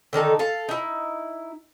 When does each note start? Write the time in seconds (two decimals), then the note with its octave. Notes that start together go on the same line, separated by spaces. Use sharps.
0.13 D3 D#3 D#4 A4
0.39 A4 F5
0.69 D#4 E4